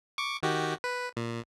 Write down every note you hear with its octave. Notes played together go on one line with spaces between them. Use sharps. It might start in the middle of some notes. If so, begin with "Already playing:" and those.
C#6 D6
D#3 F#4 G4
B4
A#2